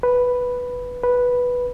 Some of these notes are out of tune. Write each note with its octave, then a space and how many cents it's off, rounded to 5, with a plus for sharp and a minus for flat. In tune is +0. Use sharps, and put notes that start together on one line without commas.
B4 +0
B4 -5